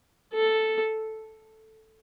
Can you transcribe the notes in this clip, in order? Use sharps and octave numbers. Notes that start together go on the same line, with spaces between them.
A4